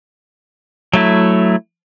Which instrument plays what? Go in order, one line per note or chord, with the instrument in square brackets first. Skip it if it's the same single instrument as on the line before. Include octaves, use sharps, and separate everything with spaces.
[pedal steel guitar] F#3 A3 E4